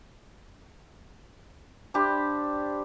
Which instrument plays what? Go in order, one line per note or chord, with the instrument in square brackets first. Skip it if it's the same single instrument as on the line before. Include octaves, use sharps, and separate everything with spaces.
[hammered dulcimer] D4 G4 C5 B5